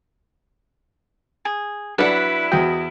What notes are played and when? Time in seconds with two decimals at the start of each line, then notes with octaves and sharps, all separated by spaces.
1.45 G#4
1.98 F#3 D4 E4 B4 F#5
2.52 E2 F#4 D#5 G5